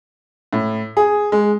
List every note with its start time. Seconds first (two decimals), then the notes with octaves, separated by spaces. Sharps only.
0.53 A2
0.97 G#4
1.32 G#3